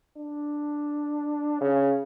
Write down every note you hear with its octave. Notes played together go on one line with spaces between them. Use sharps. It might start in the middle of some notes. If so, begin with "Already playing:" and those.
D4
C#3